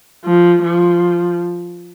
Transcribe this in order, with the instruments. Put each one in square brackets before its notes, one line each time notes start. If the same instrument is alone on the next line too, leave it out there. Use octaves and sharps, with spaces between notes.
[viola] F3
F3